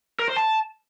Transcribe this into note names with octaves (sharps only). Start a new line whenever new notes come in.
A#4
C5
A5